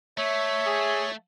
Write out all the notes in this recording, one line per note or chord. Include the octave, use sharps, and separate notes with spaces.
A3 C#5 E5
G#4